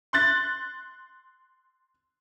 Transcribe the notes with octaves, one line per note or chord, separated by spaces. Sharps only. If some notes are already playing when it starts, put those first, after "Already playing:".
C6 F#6 A6